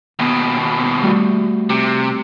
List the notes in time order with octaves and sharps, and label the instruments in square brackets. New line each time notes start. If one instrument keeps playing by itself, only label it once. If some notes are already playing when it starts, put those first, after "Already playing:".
[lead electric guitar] D#2 B2 [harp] B3
[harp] G3 A3 F#4
[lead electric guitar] C3 [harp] G4